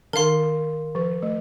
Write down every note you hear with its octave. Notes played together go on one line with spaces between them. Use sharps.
D#3 A#4 F5 C6
F3
A3